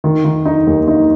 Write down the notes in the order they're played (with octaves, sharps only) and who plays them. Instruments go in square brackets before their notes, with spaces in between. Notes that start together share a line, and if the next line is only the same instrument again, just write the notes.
[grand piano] D#3
D#3
D#4
D#2
D#4